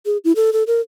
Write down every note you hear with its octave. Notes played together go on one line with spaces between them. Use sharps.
G#4
E4
A4
A4
A#4